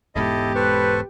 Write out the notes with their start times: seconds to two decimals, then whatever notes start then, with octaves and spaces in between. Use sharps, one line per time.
0.15 E1 G#2 B3 E4 G4 A4 D#5
0.55 A4 B4 C5 C#6